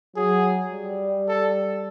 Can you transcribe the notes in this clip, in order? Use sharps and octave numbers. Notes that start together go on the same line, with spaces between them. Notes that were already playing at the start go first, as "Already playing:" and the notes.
F#3 G#4
G3
A4